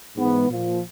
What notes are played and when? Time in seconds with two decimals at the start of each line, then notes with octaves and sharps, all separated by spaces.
0.16 G#2 E3 B3
0.48 A#2 F3